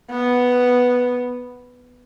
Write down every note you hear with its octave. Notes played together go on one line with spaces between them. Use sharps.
B3